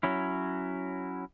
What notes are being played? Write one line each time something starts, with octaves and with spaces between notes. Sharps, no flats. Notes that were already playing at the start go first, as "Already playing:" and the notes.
F#3 C#4 E4